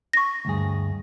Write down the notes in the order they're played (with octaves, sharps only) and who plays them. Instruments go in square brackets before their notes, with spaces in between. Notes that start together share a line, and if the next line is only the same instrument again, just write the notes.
[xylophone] C#6 A#6
[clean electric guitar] D2 G2 G#4